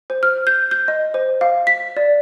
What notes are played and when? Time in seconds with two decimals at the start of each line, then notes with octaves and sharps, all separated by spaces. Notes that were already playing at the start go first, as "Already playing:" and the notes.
0.10 C5
0.23 F6
0.47 G6
0.71 G6
0.88 D#5
1.14 C5
1.41 F5
1.67 B6
1.97 D5